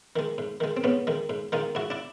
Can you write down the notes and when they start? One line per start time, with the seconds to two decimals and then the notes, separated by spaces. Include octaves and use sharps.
0.16 D#3 G#3
0.38 G#2
0.60 D#3 G#3
0.77 C4
0.84 G#2 B3 C#4
1.07 D#3 G#3
1.30 G#2
1.52 D#3 G#3 D#4 F4
1.75 G#2 E4 F#4
1.90 D4 E4